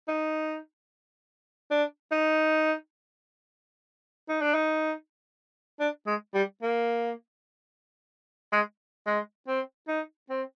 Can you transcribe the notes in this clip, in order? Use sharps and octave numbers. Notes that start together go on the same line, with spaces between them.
D#4
D4
D#4
D#4
D4
D#4
D4
G#3
G3
A#3
G#3
G#3
C4
D#4
C4